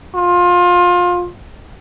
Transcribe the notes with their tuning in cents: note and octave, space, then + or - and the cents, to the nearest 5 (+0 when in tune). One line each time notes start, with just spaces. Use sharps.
F4 +25